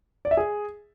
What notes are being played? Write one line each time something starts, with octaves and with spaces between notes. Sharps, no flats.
D5
E5
G#4